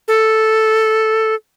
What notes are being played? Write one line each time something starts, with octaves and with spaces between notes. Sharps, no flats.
A4